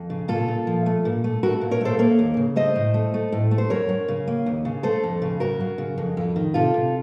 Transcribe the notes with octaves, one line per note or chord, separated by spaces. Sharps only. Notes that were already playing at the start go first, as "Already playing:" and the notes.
Already playing: F2
C#3
A#2 F4 A4
A#2
F3
A3
A#2
A3
A3 F#4 A#4
A#2
A#4 C#5
A3 A4 C5
A#3 A#4 C#5
D#2
C#3
A3 C5 D#5
A2
A3
A3
A2
A3
C5
F#2 A#4 C#5
F#2
C#3
A#3
D#2
C#3
A3 A4 C5
F2
C#3
F#2 F#4 A#4
F#2
C#3
F2
F2
D#3
C3 F4 A4
C3